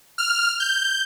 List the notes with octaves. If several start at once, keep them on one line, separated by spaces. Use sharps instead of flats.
F6
G6